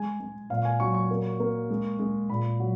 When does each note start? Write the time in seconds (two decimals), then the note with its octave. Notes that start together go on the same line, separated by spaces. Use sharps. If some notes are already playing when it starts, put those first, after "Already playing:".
Already playing: G#3 G#5
0.20 G#3
0.50 A#2 F5
0.65 G#5
0.80 F#3 C#6
0.94 C#6
1.11 A#3
1.40 A#3
1.70 G#3
1.99 G#3
2.30 A#2 B5
2.60 F#3